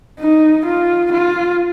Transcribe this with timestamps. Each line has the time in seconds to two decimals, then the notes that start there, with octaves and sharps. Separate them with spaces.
0.20 D#4
0.66 F4
1.12 F4